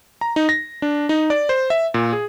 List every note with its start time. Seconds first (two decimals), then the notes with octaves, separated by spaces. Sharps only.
0.21 A#5
0.36 D#4
0.49 A#6
0.82 D4
1.09 D#4
1.30 D5
1.49 C5
1.70 E5
1.94 A#2
2.13 G#4